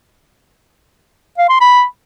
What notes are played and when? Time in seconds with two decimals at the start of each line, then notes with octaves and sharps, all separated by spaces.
1.38 F5
1.49 C6
1.61 B5